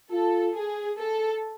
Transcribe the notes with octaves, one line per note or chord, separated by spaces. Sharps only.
F4 A4
G#4
A4